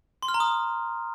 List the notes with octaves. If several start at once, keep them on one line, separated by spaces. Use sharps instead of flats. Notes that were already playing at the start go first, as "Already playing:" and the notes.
C6
F6
A#5
D#6